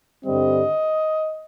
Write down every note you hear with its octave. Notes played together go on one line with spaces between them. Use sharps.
G2 D3 G3 C4 D#5